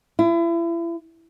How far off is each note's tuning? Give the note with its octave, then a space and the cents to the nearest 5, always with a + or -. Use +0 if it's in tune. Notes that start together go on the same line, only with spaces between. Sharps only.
E4 +35